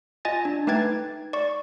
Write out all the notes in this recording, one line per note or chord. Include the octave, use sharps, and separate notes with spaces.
F4 D#5 G#5 A6
D4
A3 D#4 B4 G5 G#6 A6
D5 C#6